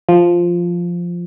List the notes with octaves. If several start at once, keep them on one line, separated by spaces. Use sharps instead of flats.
F3